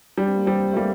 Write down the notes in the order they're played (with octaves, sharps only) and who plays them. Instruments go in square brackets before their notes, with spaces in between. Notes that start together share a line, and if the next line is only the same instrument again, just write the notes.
[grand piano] G3 [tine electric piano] D4
[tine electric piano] C4
A#3
[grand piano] G3 [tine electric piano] C4
[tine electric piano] A3
[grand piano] G3 [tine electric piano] A#3